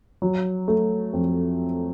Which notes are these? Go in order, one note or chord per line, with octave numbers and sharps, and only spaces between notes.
F#3
A3
F2